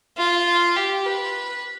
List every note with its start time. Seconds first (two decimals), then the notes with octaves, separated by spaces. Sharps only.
0.18 F4
0.76 G4
1.06 B4